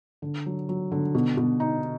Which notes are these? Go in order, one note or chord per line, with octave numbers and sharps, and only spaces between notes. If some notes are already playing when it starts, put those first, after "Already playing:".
D3
F#3
F#3
D3
B2
B2
D#4